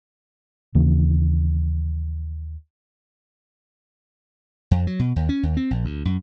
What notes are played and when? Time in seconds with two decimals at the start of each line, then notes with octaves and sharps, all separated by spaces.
0.75 D#2 C#3 E3 A#3
4.71 F2
4.87 F#3
4.99 B2
5.16 D#2
5.29 C#4
5.43 D#2
5.57 C4
5.71 A#1
5.85 D2
6.05 F#2